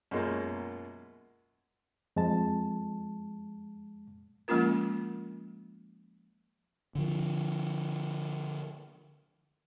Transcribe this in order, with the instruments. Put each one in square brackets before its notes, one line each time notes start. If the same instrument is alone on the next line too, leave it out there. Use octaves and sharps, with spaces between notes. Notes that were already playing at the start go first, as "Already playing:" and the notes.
[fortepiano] F#2 B2 G#3 A#3 F4
[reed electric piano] F2 G#3 A5
[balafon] F3 G#3 A#3 C#4 F4 A#4
[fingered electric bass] D3 F3